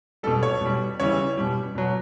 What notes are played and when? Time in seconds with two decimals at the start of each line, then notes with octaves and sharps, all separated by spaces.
0.23 G3 A4
0.27 B2
0.43 C#5
0.61 B2 G3
1.00 C#3 E3 G3 C#5
1.37 B2 G3
1.75 B2 F#3